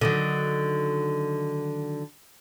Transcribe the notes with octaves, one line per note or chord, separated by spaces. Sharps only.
D3 D#3 F#3